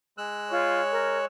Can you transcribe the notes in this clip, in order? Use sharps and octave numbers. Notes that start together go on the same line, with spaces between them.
G#3 E6 F#6
F4 C#5
A#4